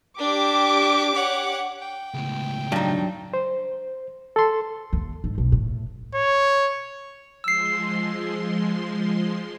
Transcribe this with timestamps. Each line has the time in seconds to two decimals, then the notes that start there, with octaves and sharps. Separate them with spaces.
0.19 D4 G4 D6
1.15 C#5 F#5
1.82 G5
2.14 C#2 A2
2.72 G2 F#3 D4 D#4
3.34 C5
4.36 A4 C6
4.93 D#2
5.24 G#2
5.38 B1
5.52 A2
6.15 C#5
7.44 F3 G#3 C6 E6 C7